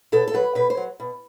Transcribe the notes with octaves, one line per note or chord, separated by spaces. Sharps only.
B2 A4
A4
F#3 B4
B2 B4
C5
F#3
B2